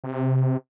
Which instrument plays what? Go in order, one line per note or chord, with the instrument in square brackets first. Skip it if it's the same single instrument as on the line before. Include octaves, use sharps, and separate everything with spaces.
[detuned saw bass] C3